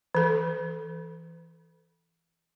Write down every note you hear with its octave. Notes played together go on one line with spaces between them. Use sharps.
E3 A4